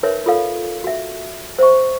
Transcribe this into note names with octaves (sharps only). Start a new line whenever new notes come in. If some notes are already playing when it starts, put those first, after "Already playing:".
D#4 A#4 B4 C#5 E5
F4 A4 F5
F#4 E5
C5 E5 C#6